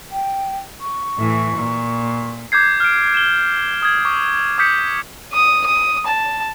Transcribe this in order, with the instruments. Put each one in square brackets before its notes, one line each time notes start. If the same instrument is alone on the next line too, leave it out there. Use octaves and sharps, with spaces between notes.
[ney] G5
C#6
[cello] A2 E3
A#2
[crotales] D6 G6 G#6 C7
F6 D7
E7 G7
D#6 G#6
C#6 D6
D6 D#6 G6 B6 C#7
[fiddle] D#6
D#6
A5